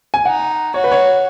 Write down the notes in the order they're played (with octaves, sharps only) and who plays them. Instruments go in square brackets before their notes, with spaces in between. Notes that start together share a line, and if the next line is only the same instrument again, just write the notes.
[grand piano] G#5
[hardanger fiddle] D#4 [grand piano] F#5
[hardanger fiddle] F#4 [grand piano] C#5
[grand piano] B4
C#5